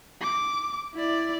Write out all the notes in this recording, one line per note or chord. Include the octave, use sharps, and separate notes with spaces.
D6
E4 D5